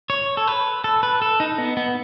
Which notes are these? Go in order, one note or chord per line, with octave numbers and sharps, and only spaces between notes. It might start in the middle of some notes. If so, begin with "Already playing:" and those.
C#5
A4
B4
A4
B4
A4
D#4
B3
B3